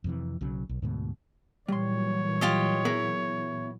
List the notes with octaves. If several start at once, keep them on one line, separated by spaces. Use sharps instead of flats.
F2 C3 E3
B1 C#3 F#3
B1
D2 G#2 B2
A#2 E3 F#3 G3 C#5 C6
F4 G4 D#5
B3 E4 G#4 A#4